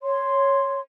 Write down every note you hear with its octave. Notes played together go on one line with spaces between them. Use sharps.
C#5 C6